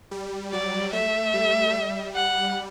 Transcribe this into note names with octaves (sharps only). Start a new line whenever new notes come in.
G3
F#3 D5
A3 E5
G3
G3
F#5